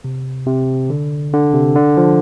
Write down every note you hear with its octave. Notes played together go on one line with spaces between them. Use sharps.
C3
C3
D3
D3
C3
D3
F3